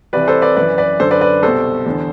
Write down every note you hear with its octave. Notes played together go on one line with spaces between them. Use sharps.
C2 C3 E3 B4 D5
A4 C5
B4 D5
F#2 E3 B4 D5
B4 D5
F#2 D3 A4 C5
B4 D5
B4 D5
C2 B2 A4 C5
E2 D3